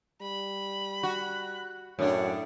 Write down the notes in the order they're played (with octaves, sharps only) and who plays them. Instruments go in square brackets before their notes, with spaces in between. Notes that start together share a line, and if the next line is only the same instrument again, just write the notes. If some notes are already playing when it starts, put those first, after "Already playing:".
[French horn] G3 [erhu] B5
[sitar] F#4 [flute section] F#6
[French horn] F#2 [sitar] A2 D4 [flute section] C#5 F#5